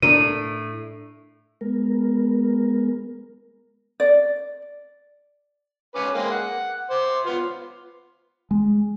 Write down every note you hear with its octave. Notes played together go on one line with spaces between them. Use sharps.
A2 D4 A#4 D#7
G#3 B3 A#4
D5
C#4 B4 D6
G#3 A#3 C4
F#5
C5 D6
B3 F4
G#3